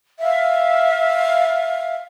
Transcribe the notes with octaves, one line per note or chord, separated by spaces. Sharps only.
E5 F5